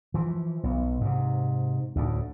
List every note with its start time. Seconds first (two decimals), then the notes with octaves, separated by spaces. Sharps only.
0.14 E3 F3
0.63 B1
1.01 G#2 C3
1.96 D2 A2